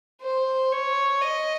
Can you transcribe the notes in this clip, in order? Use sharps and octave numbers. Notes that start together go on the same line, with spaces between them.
C5
C#5
D#5